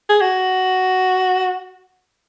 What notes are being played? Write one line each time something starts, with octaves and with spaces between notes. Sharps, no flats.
G#4
F#4